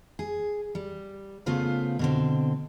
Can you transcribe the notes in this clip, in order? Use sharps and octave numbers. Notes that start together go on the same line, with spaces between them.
G#4
G3
C#3 A3 B3 F4 C5
B2 D3 C4